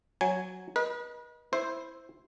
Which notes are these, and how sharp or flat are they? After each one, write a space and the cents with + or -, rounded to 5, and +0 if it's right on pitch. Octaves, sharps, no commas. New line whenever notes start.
F#3 +0 G#5 +0
B4 -40 D#5 +0
E4 +0 C5 +0